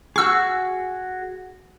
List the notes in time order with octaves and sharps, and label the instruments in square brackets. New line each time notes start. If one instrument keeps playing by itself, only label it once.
[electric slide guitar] F#4 G#4 [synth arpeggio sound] C#6 E6 F#6